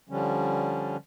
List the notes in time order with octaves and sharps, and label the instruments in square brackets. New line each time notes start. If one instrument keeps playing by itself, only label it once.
[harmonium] D3 F3 G3 C#4